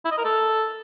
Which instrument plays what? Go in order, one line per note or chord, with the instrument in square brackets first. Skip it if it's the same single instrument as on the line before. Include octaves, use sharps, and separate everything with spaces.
[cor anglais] E4
D#5
A#4
A4